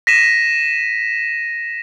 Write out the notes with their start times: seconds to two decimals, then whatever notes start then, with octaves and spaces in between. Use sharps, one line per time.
0.07 A#6 B6 D#7 E7